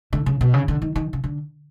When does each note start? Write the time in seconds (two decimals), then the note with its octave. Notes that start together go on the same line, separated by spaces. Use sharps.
0.13 D3
0.26 C#3
0.41 B2
0.54 C#3
0.68 D3
0.82 D#3
0.96 D#3
1.13 C#3
1.24 D3